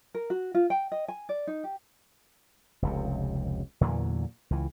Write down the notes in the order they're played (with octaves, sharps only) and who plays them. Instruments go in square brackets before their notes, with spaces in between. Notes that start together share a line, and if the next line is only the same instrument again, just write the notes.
[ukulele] A#4
F#4
F4
G5
D#5
G#5
D5
D#4
G4
[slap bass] F1 C#2 C3
E2 A#2 D3 F#3
C#2 E3